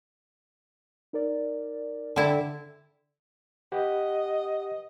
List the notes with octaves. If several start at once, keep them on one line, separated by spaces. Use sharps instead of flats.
D#4 A#4 D5
D3 E4 G5 A5
G4 B4 D#5 F#5